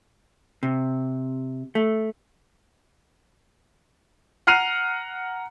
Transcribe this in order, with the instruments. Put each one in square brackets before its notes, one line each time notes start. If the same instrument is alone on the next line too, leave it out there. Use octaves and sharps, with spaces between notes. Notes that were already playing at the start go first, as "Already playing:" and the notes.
[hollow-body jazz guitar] C3
A3
[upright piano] F#5 A#5 F6 C7 D#7 F7